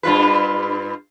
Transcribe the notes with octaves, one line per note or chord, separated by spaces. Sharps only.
G2 F4 B4